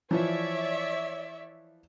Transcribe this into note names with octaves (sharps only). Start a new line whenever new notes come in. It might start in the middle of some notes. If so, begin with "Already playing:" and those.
E3 F3 C#5 D5 E5